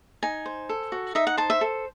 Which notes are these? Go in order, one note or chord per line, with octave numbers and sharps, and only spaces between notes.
D#4 G#5
C5
A4
F#4
D#4 E5
F#5
C5 A5
E5
A4